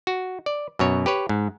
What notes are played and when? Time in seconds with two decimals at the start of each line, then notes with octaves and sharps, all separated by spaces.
0.07 F#4
0.46 D5
0.79 F#2 B2 C#5
1.06 G4 B4 C#5
1.29 G#2